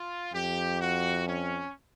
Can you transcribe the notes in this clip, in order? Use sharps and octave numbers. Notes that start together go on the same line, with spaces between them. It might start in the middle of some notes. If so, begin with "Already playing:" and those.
Already playing: F4
F2 G4
F#4
C#4